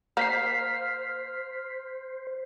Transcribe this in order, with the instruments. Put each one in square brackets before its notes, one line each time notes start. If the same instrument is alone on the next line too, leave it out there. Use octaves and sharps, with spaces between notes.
[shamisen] A#3 [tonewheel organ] C5 [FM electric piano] F6 B6 C7